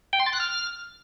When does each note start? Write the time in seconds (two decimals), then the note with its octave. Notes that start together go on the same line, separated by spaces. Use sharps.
0.13 G5
0.20 C6
0.26 A6
0.33 F#6
0.40 F6